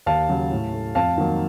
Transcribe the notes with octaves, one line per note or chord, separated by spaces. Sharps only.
D#2 F5 A5
C#3 F#3
A2
A3
F2 F5 A5
D#3 F#3 A#3